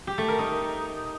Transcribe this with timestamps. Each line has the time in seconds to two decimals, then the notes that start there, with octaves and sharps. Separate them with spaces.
0.07 G4
0.18 A3
0.28 A#4
0.39 D#4